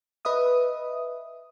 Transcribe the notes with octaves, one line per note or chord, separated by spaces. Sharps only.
B4 D#5 E5 D#6